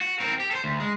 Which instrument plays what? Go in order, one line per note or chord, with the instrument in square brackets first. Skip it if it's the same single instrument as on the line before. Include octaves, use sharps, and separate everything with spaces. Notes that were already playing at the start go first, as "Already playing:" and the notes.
[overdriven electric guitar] F#4
C4 A#4
G4
A4 C5
D2
G#3